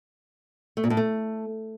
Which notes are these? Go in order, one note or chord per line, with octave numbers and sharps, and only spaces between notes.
A3
A#2
A2
A3